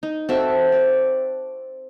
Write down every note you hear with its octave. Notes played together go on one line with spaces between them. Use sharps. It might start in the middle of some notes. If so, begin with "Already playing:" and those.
D#4
C4 F#4 A4 E5
D5